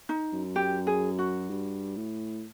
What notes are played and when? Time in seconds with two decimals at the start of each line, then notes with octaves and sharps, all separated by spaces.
0.09 D#4
0.33 F#2
0.56 G4
0.87 G#4
1.19 F#4
1.50 G2
1.97 A2